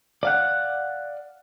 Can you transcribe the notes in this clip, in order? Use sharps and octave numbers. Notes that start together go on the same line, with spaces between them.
D5 F5 F#5